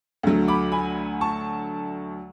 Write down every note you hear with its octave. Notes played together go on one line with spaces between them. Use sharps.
D2 D3 F#3 A3
B5 D6
G#5 B5
A5 C#6